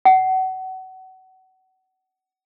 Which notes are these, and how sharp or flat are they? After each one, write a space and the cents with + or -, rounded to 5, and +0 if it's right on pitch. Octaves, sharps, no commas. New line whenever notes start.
F#5 +30